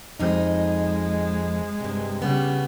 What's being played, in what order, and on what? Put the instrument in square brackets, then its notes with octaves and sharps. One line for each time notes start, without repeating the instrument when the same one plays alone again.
[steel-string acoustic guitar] F2 D#4 [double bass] G#3
[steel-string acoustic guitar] G2 C3
[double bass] C#3 G3 [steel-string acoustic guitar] B3